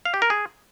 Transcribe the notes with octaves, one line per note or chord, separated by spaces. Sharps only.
F5
G4
A#4
G#4